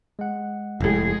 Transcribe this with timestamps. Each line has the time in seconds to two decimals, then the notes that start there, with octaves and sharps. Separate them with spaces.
0.19 G#3 F#5
0.81 F1 A2 G#3 G#4